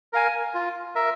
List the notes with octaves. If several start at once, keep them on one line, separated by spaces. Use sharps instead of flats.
A#4 F5 G#5
F4
A#4 E5